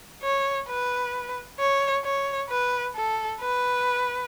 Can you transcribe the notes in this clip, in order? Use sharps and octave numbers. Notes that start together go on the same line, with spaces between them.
C#5
B4
C#5
C#5
B4
A4
B4